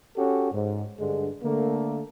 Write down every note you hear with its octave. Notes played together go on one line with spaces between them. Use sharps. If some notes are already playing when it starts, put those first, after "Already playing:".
C#4 F#4 G4 A4
G#2
G2 D3 G#3
D3 A3 A#3